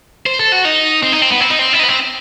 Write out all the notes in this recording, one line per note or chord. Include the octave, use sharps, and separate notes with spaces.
C5
A4
F#4
D#4
C4
D#4
C4
B3
C4
D#4
C4
E4
D#4
B3
C4